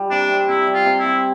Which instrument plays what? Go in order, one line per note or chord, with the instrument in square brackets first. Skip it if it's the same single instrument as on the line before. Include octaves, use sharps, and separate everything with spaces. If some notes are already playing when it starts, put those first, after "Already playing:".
Already playing: [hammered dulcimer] G3
[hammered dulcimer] C3 [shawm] D4
[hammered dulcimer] C4
[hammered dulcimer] C3 [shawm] E4
[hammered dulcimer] G3
[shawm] F4
[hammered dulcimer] C3
[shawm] E4
[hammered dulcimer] C4